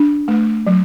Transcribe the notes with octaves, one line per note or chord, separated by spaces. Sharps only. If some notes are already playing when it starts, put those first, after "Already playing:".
Already playing: D4
A3
F#3